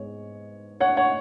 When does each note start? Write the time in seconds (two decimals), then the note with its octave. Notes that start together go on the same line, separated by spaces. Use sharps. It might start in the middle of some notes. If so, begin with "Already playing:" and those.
Already playing: G#2 G#3 B3 C#5
0.80 C#5 F#5
0.97 C#5 F#5